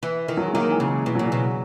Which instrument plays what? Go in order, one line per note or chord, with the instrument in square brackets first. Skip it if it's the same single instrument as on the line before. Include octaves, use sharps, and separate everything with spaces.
[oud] E3
[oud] D#3 [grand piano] E3
[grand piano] F#3
G#3
[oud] D#3 [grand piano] F#3 A#3
[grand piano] E3 G#3
[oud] C#3
[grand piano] E3 G#3
[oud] B2 [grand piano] E3
[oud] A#2 [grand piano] F#3
[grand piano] C#3 E3
[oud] B2